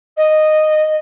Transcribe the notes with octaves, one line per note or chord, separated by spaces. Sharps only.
D#5